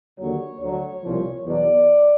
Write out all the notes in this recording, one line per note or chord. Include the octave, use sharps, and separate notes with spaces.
D#2 D3 F#3 C#5
D2 D3 F#3 C#5
C2 A#2 F3
E2 B2 F#3 D5